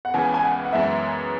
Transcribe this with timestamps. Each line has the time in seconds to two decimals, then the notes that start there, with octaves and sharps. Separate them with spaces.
0.05 F#5
0.14 C#2 C#3 E3 B3 G#5
0.34 G#5
0.43 F#5
0.65 F#5
0.73 F#2 E3 G#3 B3 E5